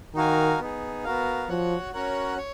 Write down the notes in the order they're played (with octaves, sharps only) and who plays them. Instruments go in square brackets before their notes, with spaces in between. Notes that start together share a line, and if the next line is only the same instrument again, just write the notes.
[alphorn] D#3 [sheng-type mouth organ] D#4 F#4 A#4 F5 G#5
[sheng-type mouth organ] B3 D#4 G#4
B3 F#4 A#4 F5
[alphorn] F3 [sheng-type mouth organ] F#4 C#5 F#5
[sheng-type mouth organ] C#4 F#4 A#4 C#5 F#5
C#5